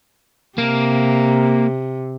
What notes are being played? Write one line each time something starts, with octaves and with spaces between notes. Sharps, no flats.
C3 A#3